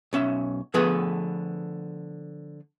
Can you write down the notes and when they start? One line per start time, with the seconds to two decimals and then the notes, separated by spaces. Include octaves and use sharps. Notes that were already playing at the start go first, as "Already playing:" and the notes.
0.13 B1 C#4 E5
0.74 D3 F3 A3 B3 G#4 B4